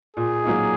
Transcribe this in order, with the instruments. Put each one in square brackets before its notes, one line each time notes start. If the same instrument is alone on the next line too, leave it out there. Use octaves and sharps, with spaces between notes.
[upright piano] A#2 [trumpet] G#4
[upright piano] F#3 A#3 D#4